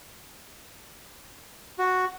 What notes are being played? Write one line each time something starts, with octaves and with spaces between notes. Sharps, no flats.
F#4